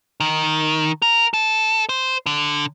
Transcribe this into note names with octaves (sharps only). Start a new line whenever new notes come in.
D#3
A#4
A4
C5
D3